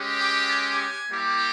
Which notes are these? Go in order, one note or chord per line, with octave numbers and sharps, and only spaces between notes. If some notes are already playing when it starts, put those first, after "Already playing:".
Already playing: G#3 C#4 G4
G5
G#5
G3 A#3 E4 G4